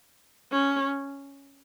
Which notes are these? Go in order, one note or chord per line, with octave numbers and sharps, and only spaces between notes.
C#4